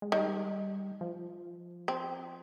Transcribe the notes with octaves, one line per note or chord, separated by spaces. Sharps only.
G#3
D#3 G3
F3
C4